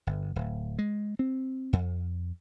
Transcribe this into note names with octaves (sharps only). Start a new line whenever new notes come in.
G1
D1
G#3
C4
F2